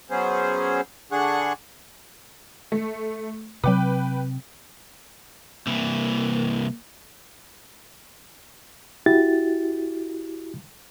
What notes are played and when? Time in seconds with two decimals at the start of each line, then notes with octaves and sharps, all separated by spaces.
0.11 F#3 B3 C#4 G#4 C5
1.12 D3 D4 G#4 F#5 C#6 F#6
2.72 A3
3.64 C3 F#3 C4 B4 G5 D6
5.67 C2 E3 A#3
9.06 E4 F#4 G4 A6